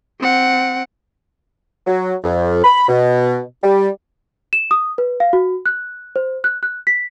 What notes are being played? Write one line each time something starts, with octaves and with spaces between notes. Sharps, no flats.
C4 F#5
F#3
F2
B5
B2
G3
E7
D#6
B4
F5
F#4
F#6
C5
F#6
F#6
B6